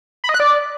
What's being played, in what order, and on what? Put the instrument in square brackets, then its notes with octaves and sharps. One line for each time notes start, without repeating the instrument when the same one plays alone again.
[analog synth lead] B5
D#5
F#6
D5